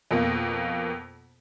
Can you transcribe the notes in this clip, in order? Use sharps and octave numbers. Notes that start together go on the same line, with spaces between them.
F2 B2 A#3